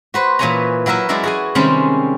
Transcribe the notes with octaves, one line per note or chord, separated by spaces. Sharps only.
F#4 B4 C5
A#2 E3 B4 C#5 G#5 A#5
F#3 E4 A#4 B4 E5
F#3 G#3 E4 C#5 D5
F#4 G#4 G#5
C3 D#3 G3 G#3 C4 C#4